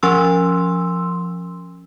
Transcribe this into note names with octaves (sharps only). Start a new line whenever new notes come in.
F3 C#4 C6 E6